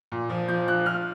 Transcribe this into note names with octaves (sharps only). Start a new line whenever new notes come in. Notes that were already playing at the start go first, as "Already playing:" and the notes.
A#2
F3
F3 G6
F3 F#6
F3 F6